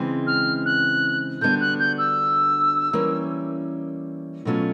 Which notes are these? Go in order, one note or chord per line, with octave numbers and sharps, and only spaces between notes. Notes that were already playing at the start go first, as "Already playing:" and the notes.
Already playing: C#3 E3 G#3 C4
F6
F#6
D3 G3 B3 D4 F#4 G6
F#6
G6
E6
E3 G3 A#3 C#4
B2 F#3 A3 C#4 F4